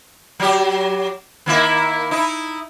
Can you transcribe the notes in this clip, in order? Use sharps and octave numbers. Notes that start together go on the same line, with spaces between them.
F#3 G4
D#3 A#3 E4
D#4 E4